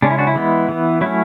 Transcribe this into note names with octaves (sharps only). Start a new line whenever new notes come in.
C#3 G#3 C#4 D4
E4
D4 F#4
E4
E3 G#3 B3
E3 B3
F#3 A3 C#4 E4